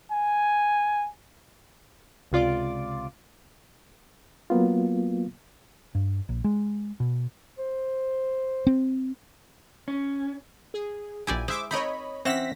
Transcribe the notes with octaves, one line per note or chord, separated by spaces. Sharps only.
G#5
C#2 C3 F4 D5 D6
F#3 A#3 B3 F4
G2
A#1
G#3
B2
C5
C4
C#4
G#4
A#1 E4 G4 D5 G#5
G#3 E4 C5 E5 D6
C4 D#4 A#4 C#5 D#5 B5
E3 C4 C#4 E5 F#5 A#6 B6